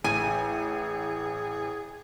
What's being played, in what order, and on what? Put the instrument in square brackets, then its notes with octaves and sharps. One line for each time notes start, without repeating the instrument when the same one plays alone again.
[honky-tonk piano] A1 [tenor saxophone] G#4 [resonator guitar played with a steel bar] G#5